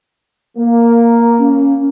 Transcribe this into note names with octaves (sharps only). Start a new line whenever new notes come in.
A#3
C#4